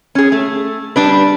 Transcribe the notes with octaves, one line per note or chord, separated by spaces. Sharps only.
C#4 G#4
A3
G3 D4 B4